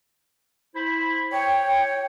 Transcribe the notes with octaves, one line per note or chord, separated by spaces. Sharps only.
E4 C5 B5
C#5 G5